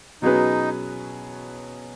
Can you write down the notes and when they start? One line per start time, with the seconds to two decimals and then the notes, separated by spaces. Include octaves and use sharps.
0.22 B2 F#3 C#4 D#4 G#4 B4